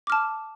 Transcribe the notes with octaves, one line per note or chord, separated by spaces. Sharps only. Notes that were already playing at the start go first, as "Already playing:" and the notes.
A5 D6 F6